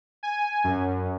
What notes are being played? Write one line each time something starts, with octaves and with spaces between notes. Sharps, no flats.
G#5
F#2